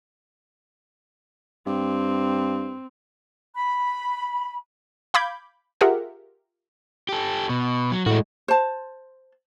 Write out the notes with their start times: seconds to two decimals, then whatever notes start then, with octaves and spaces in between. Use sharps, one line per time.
1.67 G2 C4
3.55 B5
5.14 F5 B5 D6 G6 G#6
5.81 F4 G4 G#4 A#4 E5 F#5
7.09 G4 A4
7.49 B2
7.91 F#3
8.06 A2 G#3 F#4
8.48 C5 A5